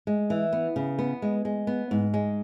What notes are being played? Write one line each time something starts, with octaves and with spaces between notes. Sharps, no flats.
G#3
E3
B3
C#3
B3
G#3
G#3
B3
G#2
G#3